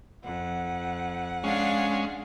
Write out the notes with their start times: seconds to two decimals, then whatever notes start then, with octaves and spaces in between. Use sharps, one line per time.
0.24 F2 F#5
1.44 G#3 C#4 D4 F5